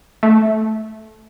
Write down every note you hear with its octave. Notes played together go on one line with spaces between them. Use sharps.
A3